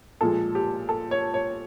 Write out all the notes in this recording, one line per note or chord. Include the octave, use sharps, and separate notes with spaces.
A#2 F3 G#3 A4
G4
A4
C#5
C#5